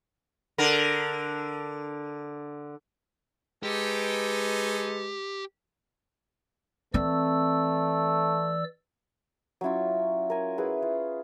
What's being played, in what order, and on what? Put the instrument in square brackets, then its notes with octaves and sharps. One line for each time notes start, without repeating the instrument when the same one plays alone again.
[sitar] D3 A#4
[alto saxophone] G#3 [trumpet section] D#4 A4 G#5 [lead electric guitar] G4 [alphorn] B4
[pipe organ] E3 D5 E6 [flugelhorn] A3 [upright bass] C4
[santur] F#3 C#4 E4 F4
A#4 G#5
E4 G#4 B4
F4